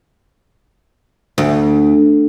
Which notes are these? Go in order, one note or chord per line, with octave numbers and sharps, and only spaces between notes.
D2